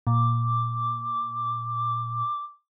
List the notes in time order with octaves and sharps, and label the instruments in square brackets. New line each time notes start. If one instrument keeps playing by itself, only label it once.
[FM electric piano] A#2 [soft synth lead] D6